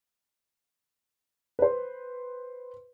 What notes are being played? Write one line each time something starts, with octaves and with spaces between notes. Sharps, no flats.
B4 C5